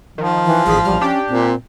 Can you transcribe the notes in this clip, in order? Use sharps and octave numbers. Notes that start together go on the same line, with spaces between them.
D#3 F3
E3
A1 G#4 B6
A#1 G3 F6
C#4 D4 G4
A#2 C4